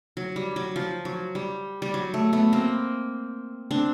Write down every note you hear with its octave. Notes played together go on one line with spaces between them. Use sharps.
F#3
G3
F#3
F3
F#3
G3
G3
F#3
A3
A3 B3
A#3 C4
C4 D4